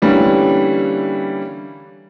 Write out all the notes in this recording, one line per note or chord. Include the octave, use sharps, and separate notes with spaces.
D3 E3 G3 A#3 C#4